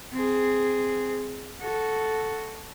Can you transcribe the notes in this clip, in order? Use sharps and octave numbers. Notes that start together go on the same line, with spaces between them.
C4 G#4
F#4 A4